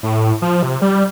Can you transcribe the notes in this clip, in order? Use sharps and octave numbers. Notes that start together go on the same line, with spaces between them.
A2
F3
C3
G3